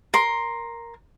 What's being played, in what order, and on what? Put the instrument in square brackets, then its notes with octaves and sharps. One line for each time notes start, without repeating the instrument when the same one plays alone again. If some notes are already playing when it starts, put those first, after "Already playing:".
[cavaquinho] A#4 C6